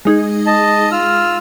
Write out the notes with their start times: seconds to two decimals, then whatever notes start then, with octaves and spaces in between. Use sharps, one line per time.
0.05 G#3 D#4 G#4
0.47 D#5 A5
0.92 F4 E6 F6